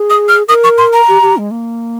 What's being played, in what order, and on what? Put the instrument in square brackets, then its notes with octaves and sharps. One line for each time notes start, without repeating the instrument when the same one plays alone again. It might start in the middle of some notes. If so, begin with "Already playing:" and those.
Already playing: [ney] G#4
[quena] D#6
F6
[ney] A#4 [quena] D#6
[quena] C#6
C6
A#5
[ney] G4
G4
G#3
A#3